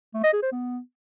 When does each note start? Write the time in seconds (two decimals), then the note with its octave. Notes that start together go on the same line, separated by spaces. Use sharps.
0.14 A3
0.24 D#5
0.33 G#4
0.43 C5
0.52 B3